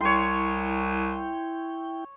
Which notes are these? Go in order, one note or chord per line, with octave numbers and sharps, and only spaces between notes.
C2 E4 C#5 G5 C6